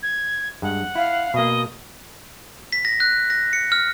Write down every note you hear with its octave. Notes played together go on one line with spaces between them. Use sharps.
G#6
G2 G#3 F#5
E4 F5
B2 A#3 D#5
B6
A#6
F#6
A#6
C#7
F6